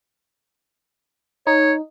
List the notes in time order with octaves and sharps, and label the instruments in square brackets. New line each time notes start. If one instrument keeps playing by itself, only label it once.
[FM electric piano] D#4 [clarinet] C#5